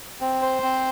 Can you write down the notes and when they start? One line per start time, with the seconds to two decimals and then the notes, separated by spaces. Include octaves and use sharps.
0.21 C4
0.42 C5
0.63 C4